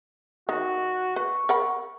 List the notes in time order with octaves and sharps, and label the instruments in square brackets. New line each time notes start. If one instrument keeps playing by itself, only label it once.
[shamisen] D#3 [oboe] F#4
[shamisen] B4 [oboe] C#6
[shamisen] A#4 F#5 B5